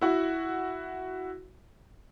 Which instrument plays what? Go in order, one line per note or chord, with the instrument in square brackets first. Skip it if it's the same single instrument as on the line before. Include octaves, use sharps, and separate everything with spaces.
[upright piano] E4 F#4